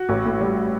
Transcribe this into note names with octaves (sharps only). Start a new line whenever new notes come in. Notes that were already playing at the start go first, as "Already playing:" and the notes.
Already playing: F#4
A1
A2
G3